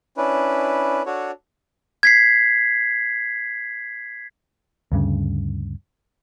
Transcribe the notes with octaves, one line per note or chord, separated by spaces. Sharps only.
C#4 D4 E4 B4
D4 F#4 A4 C#5
G#6 B6 C7
D2 G2 C#3